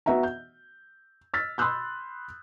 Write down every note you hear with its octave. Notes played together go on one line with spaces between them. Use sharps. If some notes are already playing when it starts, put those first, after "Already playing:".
B3 F#4 E5 F#5 A#5
G6
E6 F6 A6 B6
B5 C6 D#6 E6 F#6 G6